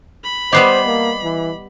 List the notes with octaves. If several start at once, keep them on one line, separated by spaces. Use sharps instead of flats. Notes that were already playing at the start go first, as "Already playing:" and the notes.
B5
G3 B3 G4 C5 D#5 D6 C7
A#3
E3